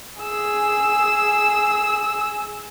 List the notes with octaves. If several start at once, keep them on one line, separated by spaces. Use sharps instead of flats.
G#4 E6